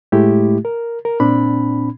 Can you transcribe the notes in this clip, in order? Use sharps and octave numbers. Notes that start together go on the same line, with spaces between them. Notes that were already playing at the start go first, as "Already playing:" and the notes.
A2 G#3 A3 E4 G4
A#4
A#4
A#2 C4 D4 B5